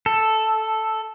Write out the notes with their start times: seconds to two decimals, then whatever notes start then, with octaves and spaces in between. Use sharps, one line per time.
0.06 A4